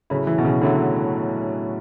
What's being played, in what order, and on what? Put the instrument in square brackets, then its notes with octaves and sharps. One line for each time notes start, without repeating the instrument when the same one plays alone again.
[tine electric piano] A2 F#3 A3 E4 [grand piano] C#3
[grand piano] E3
B2
C#3
[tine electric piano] A2 F#3 A3 E4 [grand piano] D3